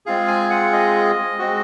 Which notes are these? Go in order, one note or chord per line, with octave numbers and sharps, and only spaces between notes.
G#3 C4 F4 G#4 F5
G#5
F#5
D#5
G#3 C4 F#4